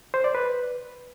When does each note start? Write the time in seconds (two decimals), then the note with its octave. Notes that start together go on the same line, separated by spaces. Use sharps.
0.14 C5
0.24 D5
0.35 B4